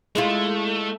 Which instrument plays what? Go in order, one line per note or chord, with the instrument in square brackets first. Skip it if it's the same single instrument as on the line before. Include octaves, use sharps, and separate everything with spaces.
[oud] G#3 E4 F4 [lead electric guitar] A3